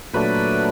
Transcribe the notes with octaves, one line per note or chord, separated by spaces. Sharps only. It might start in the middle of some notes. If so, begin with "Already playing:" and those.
A#2 F#3 A3 D4 B4